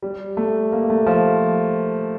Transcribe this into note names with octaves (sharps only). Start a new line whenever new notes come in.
G3
A3
A#3
A3
F3